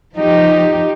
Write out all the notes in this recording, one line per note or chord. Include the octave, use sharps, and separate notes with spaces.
F3 D#4 G4